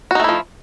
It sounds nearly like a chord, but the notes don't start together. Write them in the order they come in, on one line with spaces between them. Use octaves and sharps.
F#4 D#4 A3 E4 F3